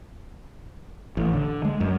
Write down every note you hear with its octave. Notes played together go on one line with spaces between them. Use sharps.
A1
D3
G#3
F#2